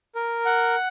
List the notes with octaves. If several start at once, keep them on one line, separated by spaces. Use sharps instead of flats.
A#4
F#5